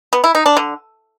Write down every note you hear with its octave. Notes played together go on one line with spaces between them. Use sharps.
B3
E4
D#4
D4
D3